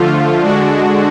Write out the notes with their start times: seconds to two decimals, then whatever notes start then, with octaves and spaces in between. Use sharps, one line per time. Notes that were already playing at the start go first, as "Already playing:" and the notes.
Already playing: D3 F3 A3 F4
0.41 D3 G#3 D4 F#4